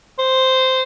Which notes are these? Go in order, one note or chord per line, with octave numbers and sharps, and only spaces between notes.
C5